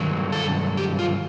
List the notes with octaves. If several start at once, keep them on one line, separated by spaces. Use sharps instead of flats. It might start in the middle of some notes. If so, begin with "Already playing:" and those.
Already playing: G2 D#3 F#3
A4
G4
F4